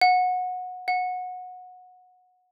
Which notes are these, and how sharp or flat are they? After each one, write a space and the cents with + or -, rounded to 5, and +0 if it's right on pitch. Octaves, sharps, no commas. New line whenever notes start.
F#5 -20
F#5 -20